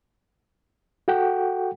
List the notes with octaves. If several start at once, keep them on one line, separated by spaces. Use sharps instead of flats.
F#4 A4 F#5 G5